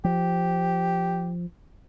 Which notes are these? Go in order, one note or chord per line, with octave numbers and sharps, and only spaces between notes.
F3 G4